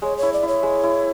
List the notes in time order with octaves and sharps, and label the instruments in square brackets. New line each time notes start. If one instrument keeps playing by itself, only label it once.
[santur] G#3 [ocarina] C#5
[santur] E4 [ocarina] C#5
[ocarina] D5
[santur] E4 [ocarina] C#5
[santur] G#3
E4